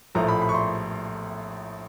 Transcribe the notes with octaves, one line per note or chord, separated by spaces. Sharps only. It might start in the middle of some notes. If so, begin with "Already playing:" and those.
A#1 A2 F3 A3 A#5
B5
B5
C#6
C6